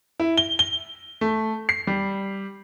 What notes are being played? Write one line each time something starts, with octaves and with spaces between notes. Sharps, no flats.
E4
G7
G7
A3
C7
G3